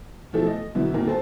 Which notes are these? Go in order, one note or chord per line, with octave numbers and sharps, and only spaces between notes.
B2 E3 F3 A3 A4
D#5
F#2 B2 D3 B3 E4
G1 A#2 D#3 A#4
A4 C5 A5